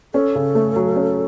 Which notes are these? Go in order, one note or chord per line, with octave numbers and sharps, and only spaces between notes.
C#4 A4
C#3
A3
F#3
C#4